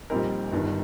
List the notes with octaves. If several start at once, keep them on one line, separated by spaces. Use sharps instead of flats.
A#1 A#2 G3 C4 D#4 A#4
G1 G2 D#3